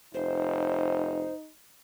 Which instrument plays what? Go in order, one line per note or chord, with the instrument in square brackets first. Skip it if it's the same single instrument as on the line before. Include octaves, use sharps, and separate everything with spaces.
[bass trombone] F1 [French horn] D#4 [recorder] C5